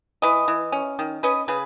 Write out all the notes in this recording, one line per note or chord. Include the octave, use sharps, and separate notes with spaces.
E3 B4 D#5
E3
C#4
D#3
C#4 B4 D#5
C#3 G#4 B4